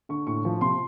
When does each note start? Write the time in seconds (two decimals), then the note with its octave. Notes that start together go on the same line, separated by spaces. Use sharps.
0.09 D3 C#6
0.27 A2 C#6
0.45 F3
0.61 C3 C6